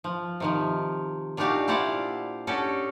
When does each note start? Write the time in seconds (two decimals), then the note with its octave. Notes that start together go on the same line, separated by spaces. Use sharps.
0.04 F3
0.40 C3 D#3 F3
1.37 A#2 D4 D#4 F#4 G4 F5
1.68 E4 G4 C5 D5 F5 F#5
2.47 C#4 D4 F#4 G4 A4